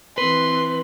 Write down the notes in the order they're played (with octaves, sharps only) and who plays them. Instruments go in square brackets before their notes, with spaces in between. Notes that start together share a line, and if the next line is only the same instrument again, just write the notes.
[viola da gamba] E3 C4 [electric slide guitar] B4 [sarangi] C6